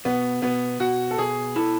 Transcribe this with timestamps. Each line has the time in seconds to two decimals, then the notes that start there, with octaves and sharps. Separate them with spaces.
0.05 B2 B3
0.42 B2 B3
0.80 B2 F#4
1.11 A4
1.18 B2 G#4
1.56 E4 A4